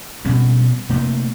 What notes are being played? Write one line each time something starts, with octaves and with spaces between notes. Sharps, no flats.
B2 G3 C4 C#4
C3 A3 A#3